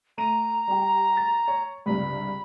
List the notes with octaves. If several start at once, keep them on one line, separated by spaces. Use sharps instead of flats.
A3 A#5 D#7
G3 G4
A6
C#5
C#2 G2 C3 B5